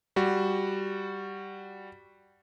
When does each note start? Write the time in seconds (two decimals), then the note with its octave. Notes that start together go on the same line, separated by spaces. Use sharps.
0.16 G3 F#4